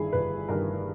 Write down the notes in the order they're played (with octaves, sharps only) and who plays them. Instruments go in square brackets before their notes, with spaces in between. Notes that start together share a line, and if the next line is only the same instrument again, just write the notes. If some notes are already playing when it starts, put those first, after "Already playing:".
Already playing: [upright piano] G1 G2 D#3 E4 G#4
G1 B4
G2 D#3 A#4